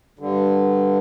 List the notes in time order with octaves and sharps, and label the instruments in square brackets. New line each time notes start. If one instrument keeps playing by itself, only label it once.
[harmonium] G2 D3